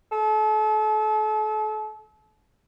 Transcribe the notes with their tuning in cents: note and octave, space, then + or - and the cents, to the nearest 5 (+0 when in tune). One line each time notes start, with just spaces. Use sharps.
A4 -35